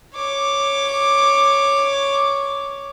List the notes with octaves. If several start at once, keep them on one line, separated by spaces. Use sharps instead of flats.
C#5 D6